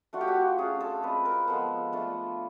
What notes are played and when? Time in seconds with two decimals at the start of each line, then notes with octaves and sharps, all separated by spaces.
0.13 A3 D4 F4 F#4
0.21 G4
0.28 F#4
0.58 A3 C#4 F4 G#4
0.81 A4
1.02 G#3 C4 F4 B4
1.25 A#4
1.47 F3 G#3 B3 A4
1.93 A3 D4 F4